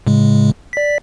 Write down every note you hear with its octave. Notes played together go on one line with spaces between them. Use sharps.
A2 C#3 G#3
D5 B6